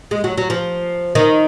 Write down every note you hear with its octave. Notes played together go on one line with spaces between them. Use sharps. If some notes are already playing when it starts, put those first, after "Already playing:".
G#3
F#3
F#3
F3
D#3